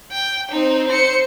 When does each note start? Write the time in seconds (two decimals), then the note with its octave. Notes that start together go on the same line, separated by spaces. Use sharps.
0.12 G5
0.51 C4 D#4
0.88 C5 C#7